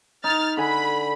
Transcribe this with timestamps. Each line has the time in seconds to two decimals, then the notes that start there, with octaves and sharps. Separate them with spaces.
0.24 D#4 F6 A6
0.57 D3 G#5 B5